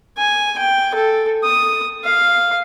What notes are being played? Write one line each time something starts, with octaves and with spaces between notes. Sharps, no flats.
G#5
G5
A4
D#6
F5